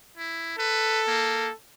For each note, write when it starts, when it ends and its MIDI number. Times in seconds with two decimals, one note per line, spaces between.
0.18 0.55 64
0.59 1.54 69
0.59 1.02 71
1.07 1.49 58